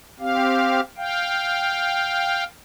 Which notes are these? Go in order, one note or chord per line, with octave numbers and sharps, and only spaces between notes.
C4 G4 F5
F5 G5